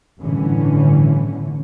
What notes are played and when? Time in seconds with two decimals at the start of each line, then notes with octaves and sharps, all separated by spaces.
0.18 G1 A2 D3 E3 C#4